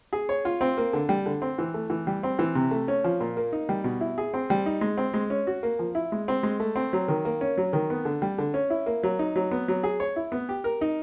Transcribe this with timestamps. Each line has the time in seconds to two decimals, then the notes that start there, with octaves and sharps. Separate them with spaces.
0.13 G#4
0.29 C#5
0.45 F4
0.61 C4
0.77 A#3
0.93 D3
1.09 G3
1.26 D3
1.42 C4
1.58 E3
1.74 A3
1.90 E3
2.07 G3
2.23 C4
2.39 E3
2.55 C3
2.71 A3
2.88 C#4
3.04 F3
3.20 A#2
3.37 A#3
3.52 D#4
3.69 G3
3.84 B2
4.01 E4
4.18 G#4
4.34 C4
4.50 G3
4.66 D#4
4.81 G#3
4.98 C4
5.14 G#3
5.30 C#4
5.47 F#4
5.63 A#3
5.79 F3
5.95 E4
6.12 G#3
6.28 C4
6.43 G#3
6.60 A3
6.76 C4
6.93 F#3
7.08 D#3
7.25 A#3
7.41 C#4
7.57 F#3
7.73 D#3
7.90 B3
8.05 D3
8.22 G3
8.38 D3
8.54 C#4
8.70 E4
8.86 A#3
9.03 F#3
9.19 D#4
9.36 F#3
9.51 B3
9.68 F#3
9.83 G#4
10.00 C#5
10.16 E4
10.32 B3
10.49 G4
10.64 A#4
10.81 D#4